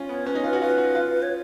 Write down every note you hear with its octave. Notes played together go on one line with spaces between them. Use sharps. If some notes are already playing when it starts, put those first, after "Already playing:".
Already playing: C#4 F4
B3 C#5
C#4 B4
D#4
F4 B4
F#4
F4 B4
F#4
F4
C#5